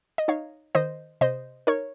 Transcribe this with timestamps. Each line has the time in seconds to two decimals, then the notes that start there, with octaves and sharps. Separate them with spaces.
0.18 D#5
0.28 D#4 C#5 F5
0.75 D#3 C5 D#5
1.21 C3 C5 D#5
1.67 D#4 A#4 C#5